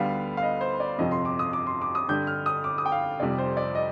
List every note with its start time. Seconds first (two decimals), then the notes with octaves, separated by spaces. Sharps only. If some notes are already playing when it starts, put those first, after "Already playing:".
Already playing: D2 D3 G3 B3 F5
0.37 F5
0.42 D#5
0.61 C5
0.80 D5
0.98 G1 F2 C3 F3 D#5
1.12 C6
1.25 D6
1.39 D#6
1.53 D6
1.67 C6
1.82 D6
1.95 D#6
2.09 G2 D3 G3 G6
2.27 F6
2.46 D#6
2.64 D6
2.78 D#6
2.86 G5
2.92 F5
3.20 F1 F2 C3 G3 D5
3.38 C5
3.57 D5
3.75 D#5